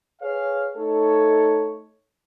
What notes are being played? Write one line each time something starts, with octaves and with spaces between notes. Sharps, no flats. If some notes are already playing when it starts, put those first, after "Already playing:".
G#4 B4 C#5 F5
A3 D#4 A4 C#5